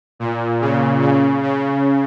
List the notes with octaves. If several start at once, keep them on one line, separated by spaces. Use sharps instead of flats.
A#2
C#3
C#3
C#3